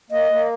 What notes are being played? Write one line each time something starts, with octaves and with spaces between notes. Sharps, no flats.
A#3 D#5
A#3